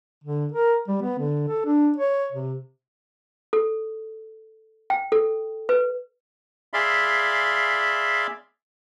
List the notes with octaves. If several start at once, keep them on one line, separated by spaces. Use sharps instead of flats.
D3
A#4
G3
B3
D3
A4
D4
C#5
C3
A4
G5
A4
B4
G#4 D5 E5 F5 B5 C6